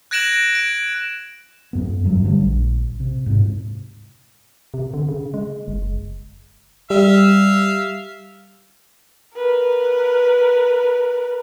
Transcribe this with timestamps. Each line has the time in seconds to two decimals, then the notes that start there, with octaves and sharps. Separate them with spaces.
0.11 F#6 G#6 A#6 D7 E7 F#7
0.55 D7
1.73 F#2 B3
2.04 F1 G2 A#2 F#3
2.25 D3 G3 A3
2.40 A#1
3.00 C3
3.26 G#2 C3
4.74 C3
4.94 D3
5.09 C#3
5.34 G#3
5.68 F#1
6.90 G3 E5 F5
9.35 A#4 B4